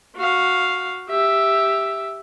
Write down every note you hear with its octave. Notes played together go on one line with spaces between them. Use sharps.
F#4 F5
G4 E5